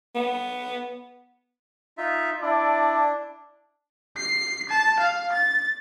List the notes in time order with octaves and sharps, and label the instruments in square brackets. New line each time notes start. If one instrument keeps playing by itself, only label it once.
[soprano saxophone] B3
[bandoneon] D#4 F4 E5
[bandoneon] D4 [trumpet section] E4 D5 A5
[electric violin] C7
A5
F5
A6